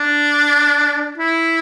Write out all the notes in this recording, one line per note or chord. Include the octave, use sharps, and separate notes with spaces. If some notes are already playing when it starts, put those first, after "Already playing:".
Already playing: D4
E4